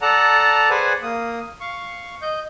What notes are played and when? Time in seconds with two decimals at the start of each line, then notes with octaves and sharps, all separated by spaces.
0.02 A4 D5 F#5 A5 A#5
0.70 G#4 B4 C5 D5 F#5 G#5
1.03 A#3 D#6
1.61 F5 C#6
2.22 D#5 G6